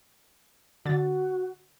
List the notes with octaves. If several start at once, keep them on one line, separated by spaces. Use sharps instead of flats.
D3 F#4 A6